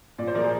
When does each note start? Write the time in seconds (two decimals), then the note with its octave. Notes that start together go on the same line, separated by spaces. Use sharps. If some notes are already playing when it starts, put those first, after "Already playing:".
0.18 A#2 D5
0.27 C5
0.35 F3 A#4 D5
0.44 G#4 C5